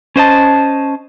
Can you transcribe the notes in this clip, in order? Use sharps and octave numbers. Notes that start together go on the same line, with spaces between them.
C#4 C5 D#5 A5